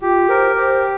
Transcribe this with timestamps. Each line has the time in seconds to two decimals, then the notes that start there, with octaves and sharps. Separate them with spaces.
0.02 F4 G4
0.29 A#4 C5
0.55 G4 C5